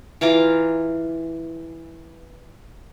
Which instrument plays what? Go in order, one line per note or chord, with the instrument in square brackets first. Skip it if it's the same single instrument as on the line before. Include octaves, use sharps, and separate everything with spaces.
[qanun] E3 F4 A#5 D6